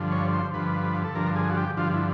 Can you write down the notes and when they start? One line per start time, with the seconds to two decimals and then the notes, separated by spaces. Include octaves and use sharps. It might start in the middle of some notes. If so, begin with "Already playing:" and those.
Already playing: G2 D3 F3
0.12 C#5
0.33 C5
0.54 G2 D3 F3 B4
1.04 A4
1.15 G2 D3 F3 A#4
1.36 G#4
1.51 F#4
1.57 G4
1.77 G2 D3 F3 F4
1.93 E4